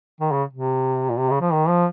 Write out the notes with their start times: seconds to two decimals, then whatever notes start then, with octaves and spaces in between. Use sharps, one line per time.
0.21 D#3
0.32 C#3
0.53 C3
1.10 A#2
1.19 C3
1.30 C#3
1.41 F3
1.53 D#3
1.69 F3